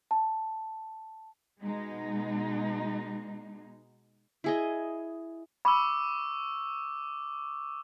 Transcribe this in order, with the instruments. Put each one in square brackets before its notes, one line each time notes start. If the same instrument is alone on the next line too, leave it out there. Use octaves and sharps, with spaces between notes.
[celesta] A5
[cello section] B2 G#3 D#4
[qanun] E4 G#4 D#5
[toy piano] B5 [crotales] C#6 D6 E6